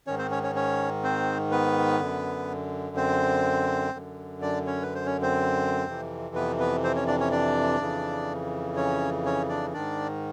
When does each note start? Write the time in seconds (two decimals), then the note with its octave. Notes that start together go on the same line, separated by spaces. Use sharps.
0.07 G#2 D#3 C#4 C#5
0.18 C4 C5
0.31 C#4 C#5
0.43 C#4 C#5
0.55 C#4 C#5
1.03 C4 C5
1.51 B3 B4
2.00 F#2 D3
2.96 C4 C5
3.94 F#2 D3
4.42 D4 D5
4.67 C#4 C#5
4.82 B4
4.95 C5
5.06 C#4 C#5
5.22 C4 C5
5.87 F2 C3 E3
6.35 B3 B4
6.60 B3 B4
6.84 C4 C5
6.96 C#4 C#5
7.07 D4 D5
7.20 C#4 C#5
7.31 D4 D5
7.80 F2 C#3 E3
8.76 C#4 C#5
9.25 C#4 C#5
9.49 D4 D5
9.73 G#2 D#3 D4 D5